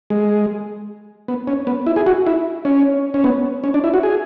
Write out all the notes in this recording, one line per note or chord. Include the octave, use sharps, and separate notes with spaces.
G#3
B3
C#4
B3
E4
G#4
F#4
E4
C#4
C#4
B3
C#4
D4
E4
F#4
G#4